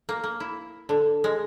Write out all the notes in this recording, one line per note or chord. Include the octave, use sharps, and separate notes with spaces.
A#3
A#3
E4
D3
G#3